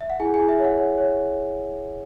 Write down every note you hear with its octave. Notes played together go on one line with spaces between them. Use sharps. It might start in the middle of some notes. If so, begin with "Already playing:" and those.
E5
F#5
E4 G#4 G#5
G#4 G#5
E4
E5
C#5
F#5
C#5
C#5